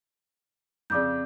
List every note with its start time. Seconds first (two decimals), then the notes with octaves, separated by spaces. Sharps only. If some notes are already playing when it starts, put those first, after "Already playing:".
0.90 F2 C#3 D5 D6 G6